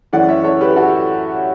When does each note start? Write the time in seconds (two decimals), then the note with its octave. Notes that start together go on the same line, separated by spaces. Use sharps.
0.13 F#2 E3 A3 C#4 D5 F#5
0.29 C#5 E5
0.44 A4 C#5
0.61 G4 B4
0.76 F#4 A4